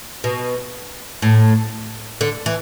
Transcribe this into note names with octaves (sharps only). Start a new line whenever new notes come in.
B2
A2
D3
E3